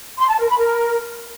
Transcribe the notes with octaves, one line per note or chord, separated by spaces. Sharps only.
C6
A5
A#4
B5
A#4